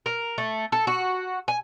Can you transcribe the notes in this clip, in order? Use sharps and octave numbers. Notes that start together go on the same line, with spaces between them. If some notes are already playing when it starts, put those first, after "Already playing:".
A#4
A3
A4
F#4
G#5